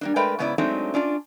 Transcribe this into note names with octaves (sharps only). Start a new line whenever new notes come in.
G3 A#3 D4
G#3 A3 A#4 B4 D5 G5
G#2 C#3 B3 E4 D5
F#3 G#3 A3 C4 D4 D#4
C#4 D4 F4 D5